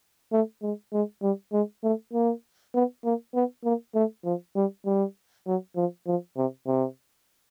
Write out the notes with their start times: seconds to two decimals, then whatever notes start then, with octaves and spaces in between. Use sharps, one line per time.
0.32 A3
0.63 G#3
0.93 G#3
1.23 G3
1.53 G#3
1.84 A3
2.13 A#3
2.75 B3
3.05 A#3
3.34 B3
3.65 A#3
3.95 A3
4.25 F3
4.56 G3
4.86 G3
5.47 F#3
5.76 F3
6.07 F3
6.37 C3
6.67 C3